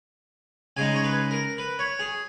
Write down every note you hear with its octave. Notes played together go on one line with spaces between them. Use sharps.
C#3 G#3 D#4 G#5
C#5
B4
A#4
B4
C#5
G#4